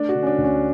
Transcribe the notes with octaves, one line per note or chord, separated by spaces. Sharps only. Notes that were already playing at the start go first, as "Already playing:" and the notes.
Already playing: A3 D4
F#4
D3
C#4
D4
D2
C#4